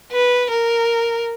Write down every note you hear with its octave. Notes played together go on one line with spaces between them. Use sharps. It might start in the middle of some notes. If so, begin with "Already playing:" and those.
B4
A#4